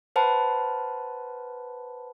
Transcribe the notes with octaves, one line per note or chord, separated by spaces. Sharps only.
B4 C5 F#5 A5 B5